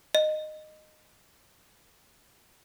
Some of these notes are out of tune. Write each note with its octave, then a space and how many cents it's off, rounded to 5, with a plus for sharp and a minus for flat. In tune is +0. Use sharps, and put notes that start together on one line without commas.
D#5 -15